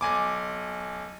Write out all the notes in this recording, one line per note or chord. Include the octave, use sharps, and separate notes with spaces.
B1 G#5 D6